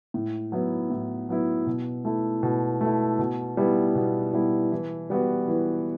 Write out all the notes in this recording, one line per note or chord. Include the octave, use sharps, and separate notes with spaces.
A2
F#3 B3 E4
A2
F#3 B3 E4
B2
A3 E4
B2
A3 E4
B2
G3 B3 E4
B2
G3 B3 E4
E3
G3 B3 F#4
E3